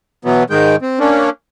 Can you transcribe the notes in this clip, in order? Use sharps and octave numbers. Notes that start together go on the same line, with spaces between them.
B2 E3 F#3 B3
G#2 D#3 G#3 G5
C4
A#3 C#4 D4